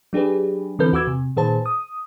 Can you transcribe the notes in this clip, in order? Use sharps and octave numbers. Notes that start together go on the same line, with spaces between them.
F#3 D4 G4 G#4 B4
D3 E3 C4 A4 B4 G6
E2 F#4 B4 D6 E6 G#6
C3
A#2 D#3 G#4 B4 C5 A5
D#6